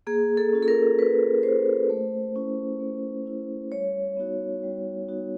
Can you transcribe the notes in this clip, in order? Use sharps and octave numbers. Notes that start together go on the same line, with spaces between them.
A#3 G#4
A4
C#4 F4
A4
A#4
A#3 B4
C#4 F4 C5
A3
C#4 E4
A3
C#4 E4
G3 C#5
B3 D#4 F#4
G3
B3 D#4 F#4